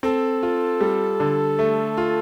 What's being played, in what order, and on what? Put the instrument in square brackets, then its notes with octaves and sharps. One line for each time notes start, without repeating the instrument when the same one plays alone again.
[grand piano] C4 [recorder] A4
[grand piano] F4
G3
D3
A3
F4